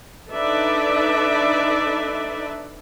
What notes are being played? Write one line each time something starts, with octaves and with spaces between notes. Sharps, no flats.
D4 D#4 A4 B4 D5 E5